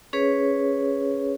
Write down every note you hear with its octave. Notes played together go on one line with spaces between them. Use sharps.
C#4 G#4 B4 C#5